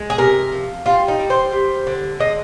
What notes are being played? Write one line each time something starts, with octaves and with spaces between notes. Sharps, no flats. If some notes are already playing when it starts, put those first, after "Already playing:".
Already playing: G#3
G#4
C3 A#4
F3
G3 F4
D#4
G3
C5
G3
D3
G#3 D#5